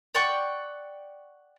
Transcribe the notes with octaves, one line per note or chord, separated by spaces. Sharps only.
D5 F#5 G5 C#6